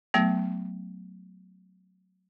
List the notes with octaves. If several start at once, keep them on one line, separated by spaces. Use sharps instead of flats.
F#3 A3 B3